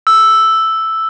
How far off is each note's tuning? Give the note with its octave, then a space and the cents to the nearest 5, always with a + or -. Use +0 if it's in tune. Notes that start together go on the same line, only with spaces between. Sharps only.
E6 +0